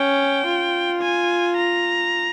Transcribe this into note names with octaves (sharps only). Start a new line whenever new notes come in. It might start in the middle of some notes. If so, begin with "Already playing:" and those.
Already playing: C#4 G5
F4
G#5
A#5